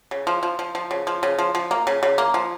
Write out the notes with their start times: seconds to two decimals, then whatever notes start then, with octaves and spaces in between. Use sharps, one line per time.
0.11 C#3
0.27 F3
0.43 F3
0.59 F3
0.75 F3
0.91 C#3
1.07 F3
1.23 C#3
1.38 F3
1.55 F3
1.71 A#3
1.87 C#3
2.03 C#3
2.18 A#3
2.34 F3